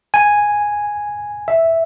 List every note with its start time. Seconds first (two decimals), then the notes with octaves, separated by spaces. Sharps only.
0.14 G#5
1.48 E5